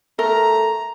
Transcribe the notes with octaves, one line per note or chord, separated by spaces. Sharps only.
A3 A#4 A#5